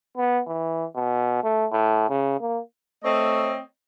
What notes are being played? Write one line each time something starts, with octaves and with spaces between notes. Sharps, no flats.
B3
E3
B2
A3
A2
C#3
A#3
A3 C4 C#5 D#5